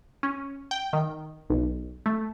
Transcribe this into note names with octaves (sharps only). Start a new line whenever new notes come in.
C#4
G5
D#3
B1
A3